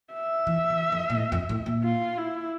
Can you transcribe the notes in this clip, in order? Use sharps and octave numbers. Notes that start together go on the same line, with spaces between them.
E5
E3
E3
F2
A#2
A2
F2
A2
A#2
F4
E4